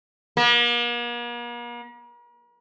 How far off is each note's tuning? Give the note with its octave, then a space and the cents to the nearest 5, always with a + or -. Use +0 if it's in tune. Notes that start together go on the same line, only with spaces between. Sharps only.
A#3 +45